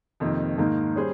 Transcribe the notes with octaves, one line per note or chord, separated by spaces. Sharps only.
F2 C3 D#3 A#3 D#4
G#2 D#3 A#3 D#4
G3 C#4 G#4 C5